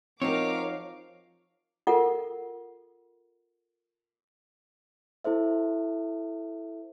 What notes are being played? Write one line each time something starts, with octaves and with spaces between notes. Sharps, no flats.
F3 C4 D#4 F#4 A#4 C#5 F5 D6
F4 A4 A#4 F#5
E4 A4 C5 E5